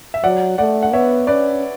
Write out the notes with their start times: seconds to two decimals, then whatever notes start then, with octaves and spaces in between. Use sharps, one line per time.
0.14 E5
0.24 F#3 D5 F#5
0.58 A3 D5 F#5
0.83 F#5
0.93 B3 C#5 E5
1.27 C#4 B4 D5